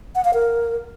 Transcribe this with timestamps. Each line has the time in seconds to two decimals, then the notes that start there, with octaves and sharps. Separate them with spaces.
0.15 F#5
0.25 F5
0.34 A#4